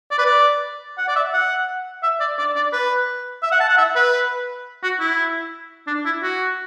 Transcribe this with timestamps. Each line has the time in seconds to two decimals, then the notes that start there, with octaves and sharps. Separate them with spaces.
0.11 D5
0.18 B4
0.26 D5
0.98 F#5
1.08 D5
1.16 E5
1.33 F#5
2.03 E5
2.20 D5
2.38 D5
2.56 D5
2.73 B4
3.43 E5
3.52 F#5
3.60 A5
3.69 F#5
3.78 E5
3.96 B4
4.83 F#4
5.00 E4
5.87 D4
6.05 E4
6.23 F#4